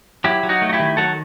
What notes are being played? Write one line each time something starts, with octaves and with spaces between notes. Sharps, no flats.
F#3 E4 G4
F#3
D#4 F#4
A3
F#4
E4 G4
D#3
F#3 F#4 A4